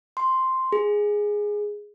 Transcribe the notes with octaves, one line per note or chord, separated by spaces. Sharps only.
C6
G#4